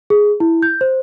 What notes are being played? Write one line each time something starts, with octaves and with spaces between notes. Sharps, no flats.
G#4
E4
G6
C5